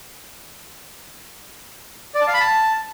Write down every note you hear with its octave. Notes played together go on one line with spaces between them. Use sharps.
D5
A5
F5
B5
A5